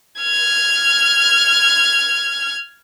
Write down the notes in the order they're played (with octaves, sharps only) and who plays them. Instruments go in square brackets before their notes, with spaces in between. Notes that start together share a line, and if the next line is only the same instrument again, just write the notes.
[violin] F6 G#6